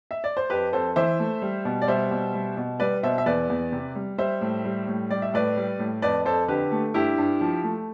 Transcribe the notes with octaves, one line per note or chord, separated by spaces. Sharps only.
E5
D5
C5
F2 G4 B4
F2 A4 C5
E3 C5 E5
A3
G3
B2
D5
G3 C5 E5
B2
G3
B2
G3 B4 D5
B2 C5 E5
E5
E2 B4 D5
E2
C3
G3
G3 C5 E5
A2
G3
A2
G3 D5
E5
A2 B4 D5
G3
A2
F2 B4 D5
F2 A4 C5
D3 G4 B4
A3
G2 E4 G4
G2
F3
A3